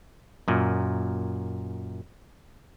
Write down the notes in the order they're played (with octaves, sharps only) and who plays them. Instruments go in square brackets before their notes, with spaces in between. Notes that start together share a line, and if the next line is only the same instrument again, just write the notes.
[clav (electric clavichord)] F#2 A#2